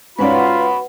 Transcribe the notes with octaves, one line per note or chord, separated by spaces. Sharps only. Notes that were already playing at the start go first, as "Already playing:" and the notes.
G#2 C#4 F4 F#4 B4 D5 F#5 B5